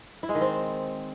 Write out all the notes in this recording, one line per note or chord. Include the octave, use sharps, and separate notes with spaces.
E4
G#3
D#3
C4